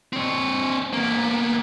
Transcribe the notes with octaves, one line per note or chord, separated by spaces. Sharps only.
C4 C#5
A#3 B3